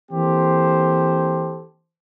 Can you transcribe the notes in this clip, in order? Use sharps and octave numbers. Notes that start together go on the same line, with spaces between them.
E3 A#3 C4 G4 A4 C5